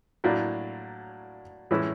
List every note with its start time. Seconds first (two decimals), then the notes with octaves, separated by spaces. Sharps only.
0.24 A2 F#3 A#3 D4
1.71 A2 E3 G#3 C#4 E4